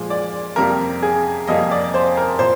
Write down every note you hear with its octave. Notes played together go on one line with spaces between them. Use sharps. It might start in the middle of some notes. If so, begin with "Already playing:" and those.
Already playing: A#2 F3 G#3
D5
F2 C3 G3 A#3 A#4
G#4
F2 C3 G3 A#3 D#5
D5
C5
A#4
A#2 A#3 C5